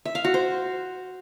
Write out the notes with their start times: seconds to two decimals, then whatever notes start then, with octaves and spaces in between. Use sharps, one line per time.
0.05 E5
0.15 F5
0.24 F#4
0.34 C5